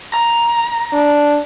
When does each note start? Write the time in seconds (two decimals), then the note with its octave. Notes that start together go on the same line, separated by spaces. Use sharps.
0.14 A#5
0.93 D4